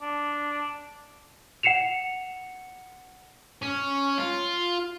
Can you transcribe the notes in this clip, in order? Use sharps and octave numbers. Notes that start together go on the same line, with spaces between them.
D4
F#5 C7 C#7 E7 F7
C#4
F4